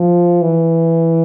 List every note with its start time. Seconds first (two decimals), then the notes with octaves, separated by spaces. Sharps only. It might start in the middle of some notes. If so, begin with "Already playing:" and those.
Already playing: F3
0.42 E3